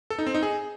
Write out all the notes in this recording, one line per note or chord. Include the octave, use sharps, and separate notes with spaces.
A4
D#4
C4
D#4
G#4